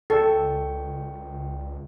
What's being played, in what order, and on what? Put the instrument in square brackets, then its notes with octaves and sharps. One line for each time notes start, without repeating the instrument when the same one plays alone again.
[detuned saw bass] C#2 [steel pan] A4 [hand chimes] D5 G5 C#6